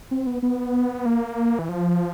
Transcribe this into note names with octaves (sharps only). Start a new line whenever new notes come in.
C4
B3
B3
A#3
E3
F3